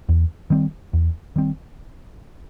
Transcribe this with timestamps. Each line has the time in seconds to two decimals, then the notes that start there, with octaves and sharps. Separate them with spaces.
0.09 E2
0.50 D#3 G3 C4
0.93 E2
1.36 D#3 G3 C4